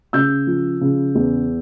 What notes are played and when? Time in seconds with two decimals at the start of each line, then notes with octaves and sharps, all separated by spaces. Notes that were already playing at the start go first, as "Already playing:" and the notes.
0.13 C#3 E6 G6
0.47 F3
0.81 C#3
1.15 E2